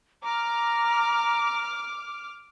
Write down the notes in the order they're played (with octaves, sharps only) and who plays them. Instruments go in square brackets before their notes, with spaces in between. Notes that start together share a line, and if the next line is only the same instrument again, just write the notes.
[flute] A#5 [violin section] D6 F6